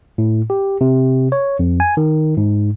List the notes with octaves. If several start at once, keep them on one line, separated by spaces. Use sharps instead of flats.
A2
G4
C3
C#5
F2
G#5
D#3
G#2